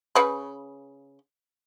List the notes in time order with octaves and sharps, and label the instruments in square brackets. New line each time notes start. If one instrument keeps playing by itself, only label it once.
[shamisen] C#3 B4 B5